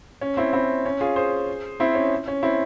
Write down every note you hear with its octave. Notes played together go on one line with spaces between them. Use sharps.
C#4
C4 E4
C4 E4
C#4
F4 G#4
G#4 C5
C4 E4
C#4
C#4
C4 E4